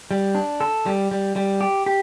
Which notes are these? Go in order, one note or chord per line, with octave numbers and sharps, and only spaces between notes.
G3
D4
A4
G3
G3
G3
G4
G4